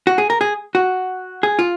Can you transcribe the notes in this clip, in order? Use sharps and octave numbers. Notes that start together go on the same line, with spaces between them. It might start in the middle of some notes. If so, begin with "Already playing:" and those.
F#4
G#4
A#4
G#4
F#4
G#4
F4